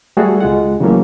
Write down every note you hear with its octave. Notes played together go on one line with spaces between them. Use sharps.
G3 A3 F#4 G#4 A4
C#2 G#3 F4 F#5
C#3 E3 F#3 A3 A#3 C#4